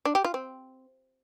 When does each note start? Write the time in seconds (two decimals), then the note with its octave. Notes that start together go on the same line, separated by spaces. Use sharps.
0.05 D4
0.15 G4
0.24 F4
0.34 C4